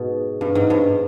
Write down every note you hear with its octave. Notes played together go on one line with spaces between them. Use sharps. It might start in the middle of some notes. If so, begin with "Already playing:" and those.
Already playing: G#2 B2
G2
G#2
G2